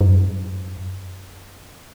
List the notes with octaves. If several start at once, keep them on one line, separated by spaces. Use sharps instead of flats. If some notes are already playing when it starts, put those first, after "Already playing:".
G2
F#2